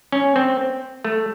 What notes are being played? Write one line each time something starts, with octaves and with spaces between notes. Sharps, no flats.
C#4
C4
A3